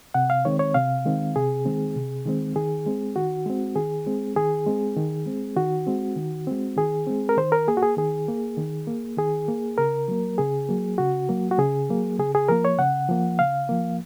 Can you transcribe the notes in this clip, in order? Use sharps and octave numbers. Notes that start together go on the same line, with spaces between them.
C3 F#5
F5
D#3 G#3 C4 C#5
C#5
C3 F5
D#3 G#3 C4
C3 G#4
D#3 G#3 C4
C3
D#3 G#3 C4
D#3 G#4
G#3 C4
D#3 F#4
G#3 C4
D#3 G#4
G#3 C4
D#3 G#4
G#3 C4
D#3
G#3 C4
D#3 F#4
G#3 C4
D#3
G#3 C4
D#3 G#4
G#3 C4
A#4
D#3 C5
A#4
A#3 G#4
F#4
G#4
D#3 G#4
A#3
D#3
A#3
D#3 G#4
A#3
C#3 A#4
F#3 A#3
C#3 G#4
F#3 A#3
C#3 F#4
F#3 A#3
F#4
C#3 G#4
F#3 A#3
C#3 G#4
G#4
F3 A#3 A#4
C#5
C#3 F#5
F3 A#3
C#3 F5
F3 A#3